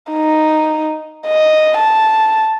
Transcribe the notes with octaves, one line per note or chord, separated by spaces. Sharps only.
D#4
D#5
A5